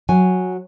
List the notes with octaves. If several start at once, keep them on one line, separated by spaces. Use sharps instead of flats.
F#3 G#5